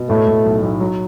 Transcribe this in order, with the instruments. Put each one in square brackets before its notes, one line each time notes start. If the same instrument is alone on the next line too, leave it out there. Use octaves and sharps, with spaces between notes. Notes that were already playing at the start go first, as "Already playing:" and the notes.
Already playing: [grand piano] B2
[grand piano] A2 [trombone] A3
[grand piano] A2
B1
B1
F#3